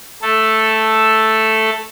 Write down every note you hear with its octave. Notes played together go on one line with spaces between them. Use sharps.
A3 A4